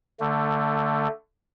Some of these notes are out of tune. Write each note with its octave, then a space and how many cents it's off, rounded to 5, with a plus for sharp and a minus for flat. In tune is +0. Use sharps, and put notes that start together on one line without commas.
D3 +0 A3 +15